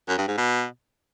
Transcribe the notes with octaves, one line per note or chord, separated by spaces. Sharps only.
F#2
G2
G#2
B2